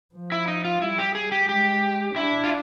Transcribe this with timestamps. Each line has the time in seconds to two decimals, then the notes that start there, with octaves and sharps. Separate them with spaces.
0.15 F3
0.32 E4
0.48 D#4
0.65 F4
0.82 G3 E4
0.99 G4
1.15 G#4
1.32 G4
1.49 G#3 G4
2.16 D4 E4
2.44 F4